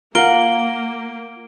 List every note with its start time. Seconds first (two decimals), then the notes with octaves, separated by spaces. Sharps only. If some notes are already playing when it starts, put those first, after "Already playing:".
0.15 A#3 F4 A#4 F#5 D7 G7